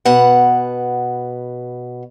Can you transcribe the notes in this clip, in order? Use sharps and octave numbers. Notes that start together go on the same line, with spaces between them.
B2 B4 F#5